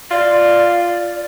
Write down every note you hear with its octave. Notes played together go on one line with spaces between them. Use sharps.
F4 D5